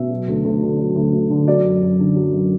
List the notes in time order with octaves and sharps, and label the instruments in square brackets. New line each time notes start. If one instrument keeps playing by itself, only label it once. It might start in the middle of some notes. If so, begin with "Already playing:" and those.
Already playing: [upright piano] B2 E5
F#3
D2
D2
D3
F#3
D2
D2
D3
F#3 D5
F#2
F#2
D3
F#3
F#2